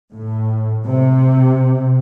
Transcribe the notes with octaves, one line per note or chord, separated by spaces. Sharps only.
A2
C3